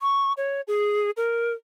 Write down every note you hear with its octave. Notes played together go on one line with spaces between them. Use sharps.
C#6
C#5
G#4
A#4